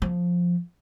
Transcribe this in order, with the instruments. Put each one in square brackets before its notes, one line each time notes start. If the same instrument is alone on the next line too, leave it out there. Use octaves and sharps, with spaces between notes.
[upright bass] F3